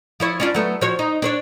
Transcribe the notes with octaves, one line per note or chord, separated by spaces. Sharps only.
F3 E4 C#5
C#4 D4 F4
F#3 A3 B3
F3 F#4 C#5
D#4
D4 C5 C#5